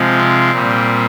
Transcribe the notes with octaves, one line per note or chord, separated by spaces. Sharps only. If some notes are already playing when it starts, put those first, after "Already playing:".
Already playing: C3 F3 G#3
C4
A#2 G3